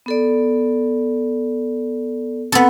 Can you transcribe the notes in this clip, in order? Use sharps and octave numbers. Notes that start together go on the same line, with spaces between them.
B3 A4 D5
B3 C4 A4